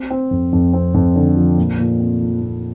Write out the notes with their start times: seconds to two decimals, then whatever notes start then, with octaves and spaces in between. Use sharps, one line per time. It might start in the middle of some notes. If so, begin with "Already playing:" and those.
Already playing: C4
0.10 C4
0.31 F2
0.53 F2
0.73 C4
0.94 F2
1.16 D3
1.37 F3
1.58 A#2
1.79 A#2
2.00 C4
2.22 F3
2.42 A#2